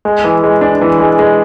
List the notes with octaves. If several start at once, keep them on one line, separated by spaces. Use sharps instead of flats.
G#3
E3
G#3
D4
E3
G#3
G#3